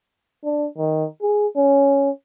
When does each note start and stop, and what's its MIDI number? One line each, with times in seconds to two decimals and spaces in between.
0.45 0.67 62
0.78 1.05 51
1.22 1.47 68
1.56 2.10 61